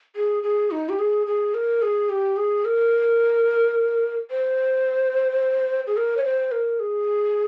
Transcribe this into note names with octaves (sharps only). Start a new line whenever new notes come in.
G#4
G#4
D#4
G4
G#4
G#4
A#4
G#4
G4
G#4
A#4
C5
G#4
A#4
C#5
C5
A#4
G#4